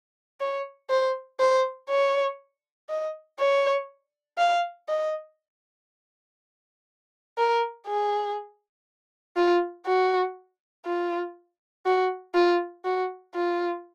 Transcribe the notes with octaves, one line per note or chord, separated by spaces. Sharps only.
C#5
C5
C5
C#5
D#5
C#5
F5
D#5
A#4
G#4
F4
F#4
F4
F#4
F4
F#4
F4